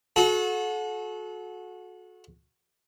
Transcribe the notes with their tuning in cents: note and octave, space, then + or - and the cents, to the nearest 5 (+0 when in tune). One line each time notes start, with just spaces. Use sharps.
F#4 -25 A4 -35